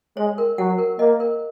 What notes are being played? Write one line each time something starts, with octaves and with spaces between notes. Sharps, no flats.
G#3 C#5
A#4
F#3 F#5
A#4
A#3 D#5
A#4